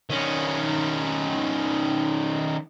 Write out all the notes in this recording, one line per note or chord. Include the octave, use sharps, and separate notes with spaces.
D#3 C#4